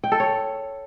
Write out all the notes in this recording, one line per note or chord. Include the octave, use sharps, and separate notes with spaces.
G5
A4
C#5